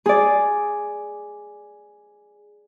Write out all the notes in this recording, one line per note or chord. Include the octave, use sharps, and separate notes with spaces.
G#4 D5